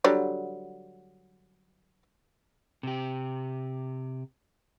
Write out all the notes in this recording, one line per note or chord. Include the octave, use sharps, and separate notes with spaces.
D3 F#3 G3
C3 G4